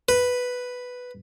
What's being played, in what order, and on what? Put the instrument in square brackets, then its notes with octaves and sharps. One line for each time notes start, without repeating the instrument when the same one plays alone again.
[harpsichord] B4